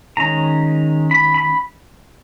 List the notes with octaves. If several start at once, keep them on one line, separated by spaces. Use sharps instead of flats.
D#3 G#3 C#4 A#5
B5
B5